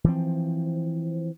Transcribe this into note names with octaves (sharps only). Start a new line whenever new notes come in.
E3 F3 C4